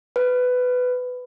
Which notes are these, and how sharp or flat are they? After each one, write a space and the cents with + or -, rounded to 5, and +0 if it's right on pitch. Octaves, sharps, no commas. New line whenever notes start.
B4 +15